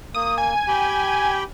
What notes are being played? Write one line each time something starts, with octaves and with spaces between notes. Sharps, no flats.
A#3 D#6
G#5
G4 G5 B5